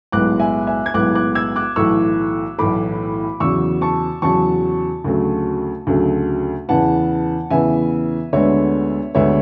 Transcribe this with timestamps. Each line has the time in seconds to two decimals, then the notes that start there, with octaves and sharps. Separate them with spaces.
0.12 B1 A2 G#3 B3 D6 F#6
0.39 E5 G#5
0.67 E5 G#5
0.86 G#6
0.94 B1 A2 G#3 B3 D6 F#6
1.15 D6 F#6
1.35 E6 G#6
1.56 D6 F#6
1.76 B1 A2 E3 A3 C#6 E6
2.58 B1 A2 E3 A3 B5 D6
3.40 E2 C#3 F#3 C#6 E6
3.81 A5 C#6
4.22 E2 C#3 F#3 A5 C#6
5.04 D2 C#3 F#3 A3
5.87 D2 C#3 F#3 A3
6.69 E2 C#3 E3 B3 F#5 A5
7.51 E2 C#3 E3 B3 E5 G#5
8.33 D2 D3 G#3 B3 C#5 E5
9.15 D2 D3 G#3 B3 C#5 E5